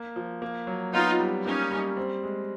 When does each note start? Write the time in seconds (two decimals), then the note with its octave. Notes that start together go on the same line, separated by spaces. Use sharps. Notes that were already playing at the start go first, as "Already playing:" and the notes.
Already playing: A#3
0.16 F3
0.42 A#3
0.67 F#3
0.93 B3 D#4 F4
1.20 G3
1.45 A#3 C#4 D#4
1.71 G3
1.97 C4
2.23 G#3